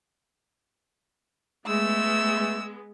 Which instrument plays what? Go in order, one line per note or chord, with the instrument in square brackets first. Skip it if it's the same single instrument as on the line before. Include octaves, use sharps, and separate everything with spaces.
[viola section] G#3 B3 [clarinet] A3 [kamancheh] E6